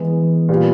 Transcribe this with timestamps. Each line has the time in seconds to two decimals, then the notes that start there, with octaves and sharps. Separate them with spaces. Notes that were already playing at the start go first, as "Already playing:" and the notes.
Already playing: E3 G#3 B3
0.49 A#2 G3 B3